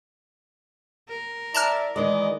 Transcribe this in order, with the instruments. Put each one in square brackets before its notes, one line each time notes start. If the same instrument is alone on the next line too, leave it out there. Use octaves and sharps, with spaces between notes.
[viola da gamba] A#4
[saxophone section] E4 D5 [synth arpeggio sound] A5 A#5 F6
[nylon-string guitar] D#3 E3 G#3 [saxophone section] D5 D#5